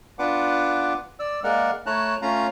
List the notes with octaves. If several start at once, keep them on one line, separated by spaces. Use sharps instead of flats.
B3 D4 F4 B4 F#5 D6
D5 E6
G#3 A#3 A#4 D5 F#5 F6
A3 E4 C#5 A5 A#5 F#6
A3 C#4 F4 F5 A#5